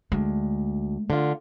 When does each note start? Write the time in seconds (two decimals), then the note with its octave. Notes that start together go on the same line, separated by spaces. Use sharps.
0.12 D2 G#3
1.10 D3 F4